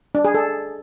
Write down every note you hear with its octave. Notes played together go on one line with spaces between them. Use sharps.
D4
G#4
A4